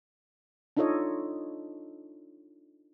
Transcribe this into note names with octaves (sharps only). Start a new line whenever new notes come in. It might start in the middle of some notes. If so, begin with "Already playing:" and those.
D4 D#4 F4 A4 C#5 D#5